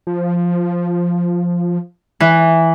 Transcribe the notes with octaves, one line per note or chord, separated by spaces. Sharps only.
F3
E3